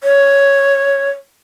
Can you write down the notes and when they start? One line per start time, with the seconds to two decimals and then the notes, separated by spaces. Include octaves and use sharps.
0.04 C#5